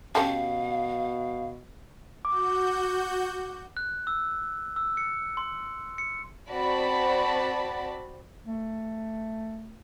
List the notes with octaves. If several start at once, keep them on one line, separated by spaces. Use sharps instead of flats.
B2 C#4 G4 A4 F5
F#4 D6 G6
F#6
E6
E6
C#7
C6
C#7
C4 F#4 D5 A5 B5
A3